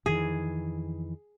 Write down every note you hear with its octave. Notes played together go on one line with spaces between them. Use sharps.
F2 D#3 E3 G#4